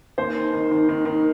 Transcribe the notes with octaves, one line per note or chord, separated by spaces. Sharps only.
D#2 C5
D#3
D#3
D#3
D#3
D#3